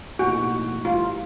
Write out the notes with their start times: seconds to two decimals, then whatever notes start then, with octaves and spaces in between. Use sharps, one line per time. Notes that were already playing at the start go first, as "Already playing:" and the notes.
0.19 B1 A2 F3 A#3 D#4 F#4
0.85 A2 E3 G3 F4